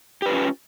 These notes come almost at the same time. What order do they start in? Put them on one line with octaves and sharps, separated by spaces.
G4 B4 F4 C#4